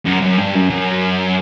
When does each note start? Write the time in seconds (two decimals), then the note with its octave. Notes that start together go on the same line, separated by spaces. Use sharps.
0.05 F#2
0.22 F#2
0.38 G2
0.54 F#2
0.70 F#2